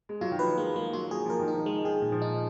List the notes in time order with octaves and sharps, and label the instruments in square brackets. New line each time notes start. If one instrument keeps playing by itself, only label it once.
[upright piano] G#3
[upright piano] F#3 [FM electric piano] F4
[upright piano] D#3
[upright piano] F3 [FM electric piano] B4
[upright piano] G#3 [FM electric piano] A#3
[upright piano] G#3 [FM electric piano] A#3
[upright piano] F#3 [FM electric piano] F4
[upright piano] F#3 [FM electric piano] G#4
[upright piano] F3 [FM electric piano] A#4
[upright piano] D#3
[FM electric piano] D#4
[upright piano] F3
[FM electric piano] G#3
[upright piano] D#3 [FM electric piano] G#4
[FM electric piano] A#2
[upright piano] F3
[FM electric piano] D#4